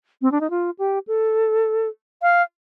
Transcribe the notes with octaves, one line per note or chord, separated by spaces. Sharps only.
C4
D4
D#4
F4
G4
A4
F5